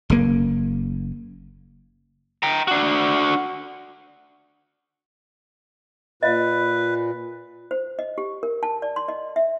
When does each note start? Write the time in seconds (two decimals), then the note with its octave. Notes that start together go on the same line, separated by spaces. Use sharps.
0.10 F#1 C#3 A#3
2.43 G5 A#5
2.68 D4 F#4
6.23 A#2 B4 D#5 F5
7.71 C5
7.99 D#5
8.18 G4
8.43 A#4
8.63 A5
8.82 D5
8.96 C6
9.08 D#5
9.36 E5